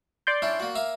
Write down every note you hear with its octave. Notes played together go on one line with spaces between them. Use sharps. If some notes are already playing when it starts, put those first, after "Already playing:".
D5 C6 G6
C#4 D4 E4
A#3 F#4
A#3 E5 F5